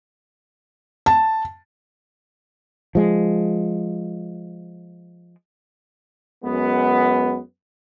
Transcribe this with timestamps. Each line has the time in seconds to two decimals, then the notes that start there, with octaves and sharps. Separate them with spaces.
1.06 A5
2.95 F3 G#3
6.44 F#2 G#3 B3